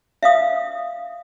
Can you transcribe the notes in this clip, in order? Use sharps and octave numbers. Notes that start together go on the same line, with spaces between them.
E5 F5 D#6